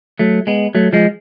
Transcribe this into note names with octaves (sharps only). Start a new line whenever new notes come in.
F#3 A3
G#3 B3
F#3 A3
F3 G#3